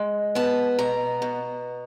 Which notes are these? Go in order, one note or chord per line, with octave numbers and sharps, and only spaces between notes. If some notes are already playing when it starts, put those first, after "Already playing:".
Already playing: G#3
B3 A5
B2 A#5
B2